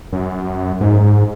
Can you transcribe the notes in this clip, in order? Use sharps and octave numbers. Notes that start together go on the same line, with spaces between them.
F#2
G#2